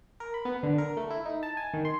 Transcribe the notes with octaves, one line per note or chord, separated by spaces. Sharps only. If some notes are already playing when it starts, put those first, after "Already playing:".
A#4
B5
B3
D3
A#4
A3
E4
D#4
A5
G#5
D#3
C6